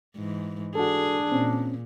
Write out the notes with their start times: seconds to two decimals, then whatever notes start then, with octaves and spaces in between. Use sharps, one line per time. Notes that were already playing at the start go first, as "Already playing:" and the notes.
0.16 G#2 E3
0.75 D4 F#4 G#4 A4
1.32 A#2 C4 C#4